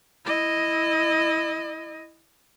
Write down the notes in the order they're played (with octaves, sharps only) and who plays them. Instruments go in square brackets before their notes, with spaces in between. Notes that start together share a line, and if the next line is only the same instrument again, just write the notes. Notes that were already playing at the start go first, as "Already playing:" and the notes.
[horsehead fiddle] E4 D#5